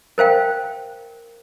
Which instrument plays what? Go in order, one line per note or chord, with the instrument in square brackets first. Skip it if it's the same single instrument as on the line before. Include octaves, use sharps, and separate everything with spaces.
[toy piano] A#4 C5 F5 G5